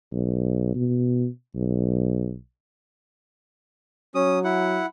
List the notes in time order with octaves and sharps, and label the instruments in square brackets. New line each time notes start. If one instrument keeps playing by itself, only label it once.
[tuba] B1
B2
B1
[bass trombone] F#3 [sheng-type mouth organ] C#4 D#6
[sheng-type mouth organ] E4 F#5